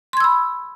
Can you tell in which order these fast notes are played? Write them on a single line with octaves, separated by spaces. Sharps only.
C6 G#6 E6 B5